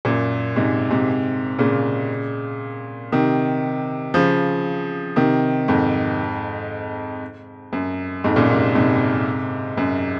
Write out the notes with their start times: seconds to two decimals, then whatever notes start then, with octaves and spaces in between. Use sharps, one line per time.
0.05 F#2 A#2
0.56 G#2 C3
0.90 G#2 C3
1.59 A#2 C#3
3.12 C3 D#3
4.14 C#3 F3
5.16 C3 D#3
5.68 F2 G#2
7.73 F#2
8.24 F2 G#2
8.36 F#2 A#2
8.50 G#2 C3
8.75 G#2 C3
9.77 F#2